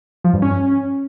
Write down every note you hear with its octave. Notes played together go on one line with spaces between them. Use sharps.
F3
G2
C#4